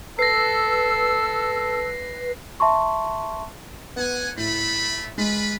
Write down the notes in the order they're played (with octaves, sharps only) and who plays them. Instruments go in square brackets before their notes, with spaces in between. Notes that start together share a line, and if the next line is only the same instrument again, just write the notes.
[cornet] A4 [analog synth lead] B4 [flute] E6 [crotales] A#6 C7
[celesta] E5 A5 C6 C#6
[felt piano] B3 [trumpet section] F#5 G#5
[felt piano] A2 [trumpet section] A3 B5
[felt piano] G#3 [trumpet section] F4 B4 B5